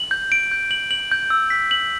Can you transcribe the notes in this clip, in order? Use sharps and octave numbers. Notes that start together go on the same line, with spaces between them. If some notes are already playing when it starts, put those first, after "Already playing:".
Already playing: F#7
G6
D7
G6
F#7
F#7
G6
E6
B6
F#7